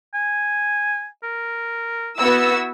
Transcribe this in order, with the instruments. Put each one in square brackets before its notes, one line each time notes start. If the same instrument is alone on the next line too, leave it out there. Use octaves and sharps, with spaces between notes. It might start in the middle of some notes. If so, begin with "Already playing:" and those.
[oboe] G#5
A#4
[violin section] B3 F#4 E6 [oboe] E4